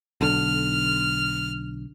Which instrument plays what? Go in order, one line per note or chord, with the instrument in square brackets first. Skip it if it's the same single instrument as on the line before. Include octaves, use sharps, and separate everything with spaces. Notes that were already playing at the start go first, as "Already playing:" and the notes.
[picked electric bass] B1 D3 [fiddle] F6